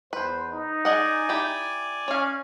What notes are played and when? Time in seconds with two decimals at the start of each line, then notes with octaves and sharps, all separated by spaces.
0.13 E2 B4 C5
0.51 D#4
0.85 G#4 D5 D#5 F#5 G#5
1.29 E4 G4
2.08 C#4 C#5 F5